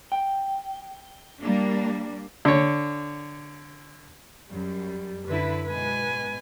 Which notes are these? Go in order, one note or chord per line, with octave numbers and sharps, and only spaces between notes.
G5
G3 A#3 D4
D3 C#5
F#2 G3
F#2 D3 E4 B4
G#2 B2 B4 G#5